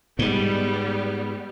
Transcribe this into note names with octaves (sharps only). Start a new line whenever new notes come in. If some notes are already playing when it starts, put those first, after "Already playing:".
G#2 G3 B3